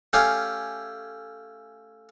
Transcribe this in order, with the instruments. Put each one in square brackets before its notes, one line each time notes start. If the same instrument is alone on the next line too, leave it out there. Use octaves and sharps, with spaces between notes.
[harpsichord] A3 C#4 G4 F5 G#5